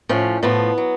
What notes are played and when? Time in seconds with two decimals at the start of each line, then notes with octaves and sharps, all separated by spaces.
0.09 A2 F3 C#4
0.43 A2 F3 B3
0.78 F#3